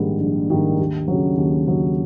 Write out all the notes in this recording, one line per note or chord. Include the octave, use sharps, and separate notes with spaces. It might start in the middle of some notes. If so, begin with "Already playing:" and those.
Already playing: A#1 G#2 D#3 G3 A#3
A#1
G#2 D#3 G3 A#3
D#2
C#3 F#3
D#2
C#3 F#3